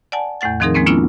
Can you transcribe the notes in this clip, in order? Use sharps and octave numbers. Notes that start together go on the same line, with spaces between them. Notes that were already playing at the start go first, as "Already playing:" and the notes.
D5 F#5 G#5 A5
E2 A2 A3 F#5 A6
D#3 F3 C4 D#4 G#4 A#4
F3 G#3 A#3 C4 C#4
A#3 B3 C#4 D4 E4 F4